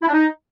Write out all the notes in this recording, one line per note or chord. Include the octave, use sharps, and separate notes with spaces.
E4
D4
D#4